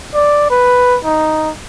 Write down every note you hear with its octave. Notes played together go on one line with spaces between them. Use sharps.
D5
B4
D#4